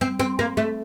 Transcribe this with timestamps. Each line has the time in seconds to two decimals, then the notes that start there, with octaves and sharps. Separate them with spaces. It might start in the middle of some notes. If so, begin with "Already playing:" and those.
0.01 C4
0.19 C4
0.39 A#3
0.57 A3